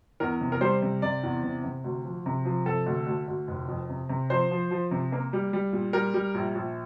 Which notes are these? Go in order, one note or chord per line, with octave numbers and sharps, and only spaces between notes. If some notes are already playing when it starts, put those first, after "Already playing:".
E2 A#4
C3
A#4
G3 C5
C3
C3 D5
E2
C3
C3
D2
F3
C3
F3
C3 A4
D2
D2
D2
F1
F2
C3
C3
F3 C5
F3
F3
C3
A#3
G3
G3
A#2
G3 A#4
G3
A#1
A#1